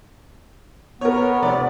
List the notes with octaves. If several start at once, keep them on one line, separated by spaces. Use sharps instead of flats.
B3 A#4 C#5
F1 D5